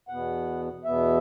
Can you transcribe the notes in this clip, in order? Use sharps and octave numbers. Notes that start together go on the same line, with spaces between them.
E2 B2 B3 F#5
E2 B2 B3 E5